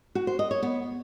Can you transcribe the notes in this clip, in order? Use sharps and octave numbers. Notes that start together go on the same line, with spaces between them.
F#4
C5
D#5
C#5
B3